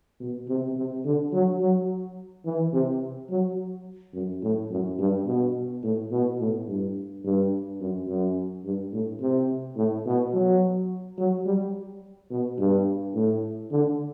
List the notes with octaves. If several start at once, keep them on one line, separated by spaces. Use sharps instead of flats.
B2
C3
C3
D3
F#3
F#3
E3
C3
F#3
F#2
A2
F#2
G2
B2
A2
B2
A2
G2
G2
F#2
F#2
G2
A2
C3
A2
B2
F#3
F#3
G3
B2
G2
A2
D3